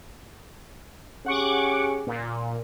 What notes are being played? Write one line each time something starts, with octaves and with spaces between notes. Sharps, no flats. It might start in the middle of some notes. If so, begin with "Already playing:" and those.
C#4 G4 G#4 F#5 C#6 D6
A#2